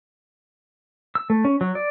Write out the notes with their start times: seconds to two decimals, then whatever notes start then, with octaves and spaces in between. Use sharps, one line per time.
1.15 E6
1.30 A3
1.45 C#4
1.61 F#3
1.75 D5